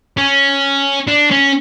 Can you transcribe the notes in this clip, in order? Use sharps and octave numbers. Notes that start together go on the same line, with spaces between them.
C#4
D4
C#4